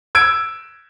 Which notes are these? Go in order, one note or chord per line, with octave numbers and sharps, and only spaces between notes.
E6 G#6 D7